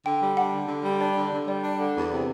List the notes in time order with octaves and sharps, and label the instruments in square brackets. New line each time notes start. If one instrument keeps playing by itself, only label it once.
[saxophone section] D3 [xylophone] G5
[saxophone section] G3
[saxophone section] D4 [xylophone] F#5
[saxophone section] D3
D3
G3
[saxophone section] D4 [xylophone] D5
[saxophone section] D3
D3
[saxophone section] G3 [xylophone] D5
[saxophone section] D4
D3
E2
C3